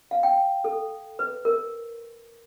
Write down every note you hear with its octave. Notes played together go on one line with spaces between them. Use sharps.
F5
G5
A4
B4
A#4